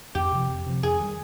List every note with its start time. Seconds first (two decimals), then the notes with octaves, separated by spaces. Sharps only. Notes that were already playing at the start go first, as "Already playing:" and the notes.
0.15 F2 G4
0.32 C3 F3
0.49 F2
0.66 C3 F3
0.83 F2 G#4
1.00 D#3 G3